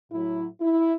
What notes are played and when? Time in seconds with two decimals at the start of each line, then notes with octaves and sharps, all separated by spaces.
0.11 A2 F#3 E4
0.61 E4